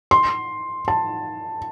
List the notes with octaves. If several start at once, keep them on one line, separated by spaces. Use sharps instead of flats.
C6
A5